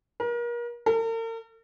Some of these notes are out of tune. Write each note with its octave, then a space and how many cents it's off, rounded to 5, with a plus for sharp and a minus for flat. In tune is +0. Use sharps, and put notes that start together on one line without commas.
A#4 +35
A#4 -45